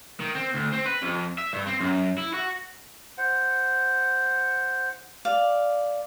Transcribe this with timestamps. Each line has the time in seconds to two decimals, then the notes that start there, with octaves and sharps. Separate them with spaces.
0.20 D#3
0.35 C4
0.54 D2
0.72 C4
0.86 B4
1.02 F2
1.38 E5
1.53 G2
1.67 C4
1.80 F#2
2.18 E4
2.34 F#4
3.18 C5 F#5
5.25 D5 F5